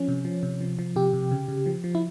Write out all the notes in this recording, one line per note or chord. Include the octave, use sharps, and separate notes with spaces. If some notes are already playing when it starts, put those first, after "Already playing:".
Already playing: F3 C#4
C3
F3
C3
F3
F3
C3 G4
C3
C#3
C#3
F3
F3
E4